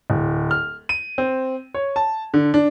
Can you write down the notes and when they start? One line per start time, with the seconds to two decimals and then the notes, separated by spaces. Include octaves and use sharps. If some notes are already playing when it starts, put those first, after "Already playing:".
0.10 D1
0.51 F6
0.89 D#7
1.18 C4
1.75 C#5
1.96 A5
2.34 D3
2.54 D4